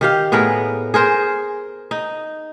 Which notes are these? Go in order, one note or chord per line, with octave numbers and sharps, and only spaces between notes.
D#3 G4 F5
A2 B3 G#4 A#4
G#4 A#4 C5
D#4